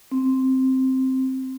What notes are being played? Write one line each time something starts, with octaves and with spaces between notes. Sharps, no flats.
C4